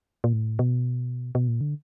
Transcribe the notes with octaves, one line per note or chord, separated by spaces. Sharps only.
A#2
A2
B2
B2
A#2
D3